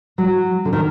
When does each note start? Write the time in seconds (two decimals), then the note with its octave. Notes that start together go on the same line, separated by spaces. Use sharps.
0.18 F#3
0.65 D3
0.73 D#3